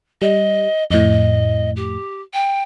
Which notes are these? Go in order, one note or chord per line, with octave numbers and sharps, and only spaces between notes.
G3 D#5
F2 A2 D#5
G4
G5